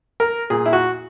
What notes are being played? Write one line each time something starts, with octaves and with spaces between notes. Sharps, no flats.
A#4
A#2 G#4
E4
F#4